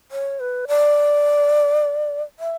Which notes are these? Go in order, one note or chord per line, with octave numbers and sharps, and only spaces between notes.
C#5
B4
D5
E5